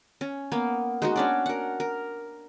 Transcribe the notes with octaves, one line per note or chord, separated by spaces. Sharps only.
C#4
A#3 B3
G#3 D#4 F#4
C#4 D4 D5
A#4 F#5
A#4